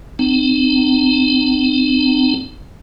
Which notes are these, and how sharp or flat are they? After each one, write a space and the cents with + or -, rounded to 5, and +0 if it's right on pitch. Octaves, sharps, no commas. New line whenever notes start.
C4 -30 D#4 -45